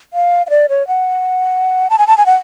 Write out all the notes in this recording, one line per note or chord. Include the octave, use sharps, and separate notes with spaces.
F5
F5
D5
C#5
F#5
A5
G#5
A5
G#5
F#5